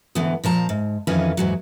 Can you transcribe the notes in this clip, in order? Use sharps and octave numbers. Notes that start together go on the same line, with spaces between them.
D2 G#2 D3 E3 B3
A#2 F3 A5 A#5
G#2
F2 D#3 E3 C#4 F4 G#5
E2 G#2 F#3